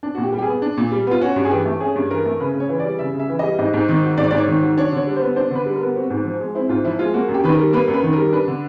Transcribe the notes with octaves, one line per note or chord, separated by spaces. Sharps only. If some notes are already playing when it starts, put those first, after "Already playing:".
D4
A#2 F#4
G4
G3
G4
G#4
B3
D4
A#2
G3
B3 F4
C#4 F#4
G2
G#4
E3 G4
A3
C#4 G#4
G2
E3 A#4
A3
C#3 B4
C#3
C#5
E3
D5
G3
C#3 E5
C#3
E5
E3
G3 D#5
G#2 D#5
G#2
D#3
F#3
G#2 D5
G#2 D5
C#5
D#3
F#3
D4 C#5
D3 C#5
G3
C5
B3
D4 C5
D3 B4
G3
A#4
B3
C4 F#4
G#2
F3
G#3
C4 E4
G#2 F4
F3 E4
G#3 F4
A#3 F#4
F#2
G4
D#3 B4
G3 A#4
A#3 B4
F#2
B4
D#3
G3 A#4
D4 B4
D3